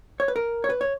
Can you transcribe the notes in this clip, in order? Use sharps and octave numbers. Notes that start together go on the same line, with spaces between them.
C#5
B4
A#4
C#5
B4
C#5